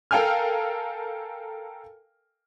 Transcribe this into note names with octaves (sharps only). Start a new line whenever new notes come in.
A4 A#4 F5 G5 G#5 F6